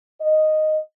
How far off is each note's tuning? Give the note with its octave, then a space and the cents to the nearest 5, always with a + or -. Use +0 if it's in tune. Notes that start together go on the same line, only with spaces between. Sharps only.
D#5 -5